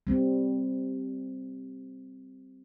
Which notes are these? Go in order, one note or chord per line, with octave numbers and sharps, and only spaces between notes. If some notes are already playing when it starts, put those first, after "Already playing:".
G3 C4